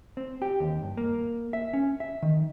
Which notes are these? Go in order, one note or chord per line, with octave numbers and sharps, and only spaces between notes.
C4
G4
D#2
G2
A#3
E5
C#4
E5
D#3